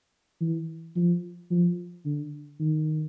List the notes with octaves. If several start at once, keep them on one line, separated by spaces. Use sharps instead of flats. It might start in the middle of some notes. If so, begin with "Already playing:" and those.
E3
F3
F3
D3
D#3